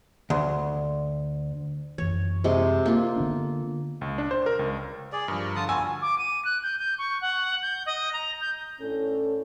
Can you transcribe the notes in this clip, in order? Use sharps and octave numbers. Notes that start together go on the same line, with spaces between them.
D2
F#2 E3 C#5
C3 G#3 C6
A#3 F4
D3 B3 D4
C#2
D4
C5
A#4
C#2
G#4 D5
G2 F3 A#4
D3 F4 A5 D#6
B3 F4 F#4 G#5 E6
D6
D#7
F#6
G6
G6
C#6
F#5
G6
D#5
A#5
G6
A2 C#4 D4 A4